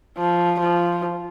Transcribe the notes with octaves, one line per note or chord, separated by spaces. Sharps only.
F3
F3